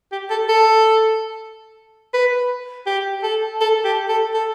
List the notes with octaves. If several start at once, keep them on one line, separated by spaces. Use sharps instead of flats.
G4
A4
A4
B4
G4
A4
A4
G4
A4
A4